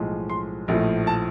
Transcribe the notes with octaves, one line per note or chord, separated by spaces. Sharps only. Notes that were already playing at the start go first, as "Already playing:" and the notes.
Already playing: B1 A2 F3 G#3
C6
A#1 A2 F3 A3
A5